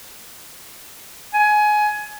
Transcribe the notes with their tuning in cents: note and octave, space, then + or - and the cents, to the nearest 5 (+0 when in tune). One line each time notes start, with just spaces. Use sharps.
G#5 +20